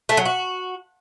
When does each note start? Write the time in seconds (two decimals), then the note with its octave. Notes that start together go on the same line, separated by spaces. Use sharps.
0.09 A3
0.17 F#3
0.25 F#4